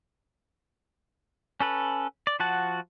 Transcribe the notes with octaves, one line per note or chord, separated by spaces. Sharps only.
C#4 A4 B4
D5
F3 F#4 F#5 A5